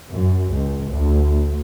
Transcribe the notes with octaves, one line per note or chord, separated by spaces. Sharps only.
F#2
C#2
D2